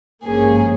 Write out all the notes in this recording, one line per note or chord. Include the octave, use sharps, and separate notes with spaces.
G#1 G2 F3 A#3 C#4 G#4